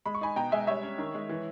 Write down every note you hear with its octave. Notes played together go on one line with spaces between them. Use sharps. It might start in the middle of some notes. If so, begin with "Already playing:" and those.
G#3 B5
C#6
D#4 G#5 B5
B2 G5 A#5
G#3 E5 G#5
G3 C#5 E5
C#4
D#3
G#3
E3